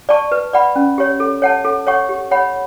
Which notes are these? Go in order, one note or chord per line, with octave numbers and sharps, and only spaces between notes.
D5 A5 C#6
B4
D5 F#5 B5
C#4
G4 C#5
A4
C#5 F#5 A5
A4
C#5 F#5 C#6
G4
C#5 F#5 B5